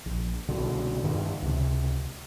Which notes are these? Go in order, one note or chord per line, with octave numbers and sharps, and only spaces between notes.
A#1
C2 B2 D3
G2 D3 D#3
C#2 C3